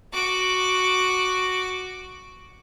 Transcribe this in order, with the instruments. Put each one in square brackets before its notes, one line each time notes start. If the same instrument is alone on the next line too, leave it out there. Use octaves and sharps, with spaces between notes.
[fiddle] F#4 D6